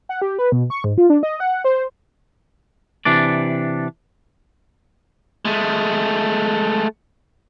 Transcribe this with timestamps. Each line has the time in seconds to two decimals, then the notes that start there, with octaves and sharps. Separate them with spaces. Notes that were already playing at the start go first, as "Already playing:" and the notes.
0.09 F#5
0.22 G4
0.38 B4
0.52 B2
0.70 C#6
0.84 G#2
0.98 F4
1.10 D4
1.23 D#5
1.40 F#5
1.64 C5
3.05 C3 E3 D4 D5
5.45 G#3 A3